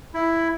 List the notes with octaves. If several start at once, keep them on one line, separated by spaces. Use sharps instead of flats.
E4